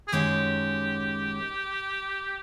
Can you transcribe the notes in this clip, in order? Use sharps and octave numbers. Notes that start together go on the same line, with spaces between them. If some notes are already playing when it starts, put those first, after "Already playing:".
G#4
F#2 D#3 G#3 C#4 F#4 G4